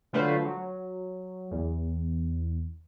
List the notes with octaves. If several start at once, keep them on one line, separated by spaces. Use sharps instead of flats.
D3 F#3 A3 F4 B4 C5
F#3
E2